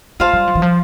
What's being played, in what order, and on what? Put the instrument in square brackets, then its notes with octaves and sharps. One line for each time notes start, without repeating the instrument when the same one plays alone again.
[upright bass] A3 [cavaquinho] F4 C5 F5 A5
[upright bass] G3
F3
E3
F3